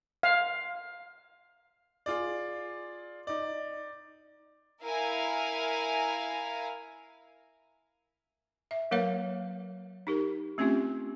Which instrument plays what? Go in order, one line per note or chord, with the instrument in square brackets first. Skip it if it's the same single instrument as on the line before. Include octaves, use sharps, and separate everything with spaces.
[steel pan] F5
[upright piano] F4 G#4 D5
D#4 D5
[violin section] E4 A#4 F5 G#5 A#5
[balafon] E5
F#3 A#3 A#4 B4 C#5 F5
D#4 G4 A#4
A3 C4 C#4 F4 G4